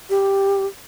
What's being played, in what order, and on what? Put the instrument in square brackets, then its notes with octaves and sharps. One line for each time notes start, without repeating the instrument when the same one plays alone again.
[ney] G4